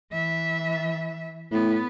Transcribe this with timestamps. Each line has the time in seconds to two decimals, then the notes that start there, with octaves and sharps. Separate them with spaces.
0.12 E3 E5
1.52 A2 B3